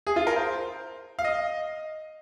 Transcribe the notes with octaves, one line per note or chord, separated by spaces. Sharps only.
G#4
F4
A#4
C5
F5
D#5